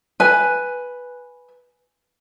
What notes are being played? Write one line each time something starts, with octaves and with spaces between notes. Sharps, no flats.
B4 G#5